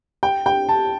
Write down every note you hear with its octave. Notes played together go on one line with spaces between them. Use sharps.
G5
G5
A5